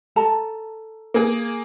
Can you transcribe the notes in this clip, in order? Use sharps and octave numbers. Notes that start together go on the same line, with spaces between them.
A4 A5 A#5
A#3 G#4